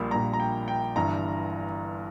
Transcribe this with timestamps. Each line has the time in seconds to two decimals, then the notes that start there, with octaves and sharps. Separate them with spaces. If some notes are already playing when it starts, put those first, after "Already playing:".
Already playing: A#1 A#2 G3 A#3 B5
0.11 A#1 A#2 G3 A#3 A#5
0.33 A#5
0.40 G5
0.68 G5
0.96 G1 G2 E3 A#5